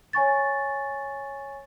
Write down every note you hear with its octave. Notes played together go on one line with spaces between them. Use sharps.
C#5 G#5 C#6 A6